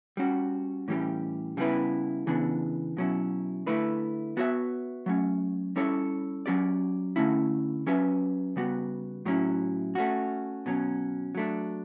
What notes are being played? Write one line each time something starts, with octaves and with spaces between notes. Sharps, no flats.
G3 C#4 F#4
A2 E3 G3 C#4 G4
C#3 G3 B3 E4 B4
C#3 E3 B3 D4
B2 F#3 C#4 E4
D3 A3 E4 B4
B3 F#4 C#5 E5
F#3 A3 C#4
G3 C#4 E4 A4 C#5
F#3 C#4 G4 D5
D3 A3 C#4 E4
F#3 C#4 G4 B4 E5
C#3 G3 B3 F#4
A2 F#3 C#4 E4
A3 C#4 F#4
B2 F#3 C#4
F#3 A3 D4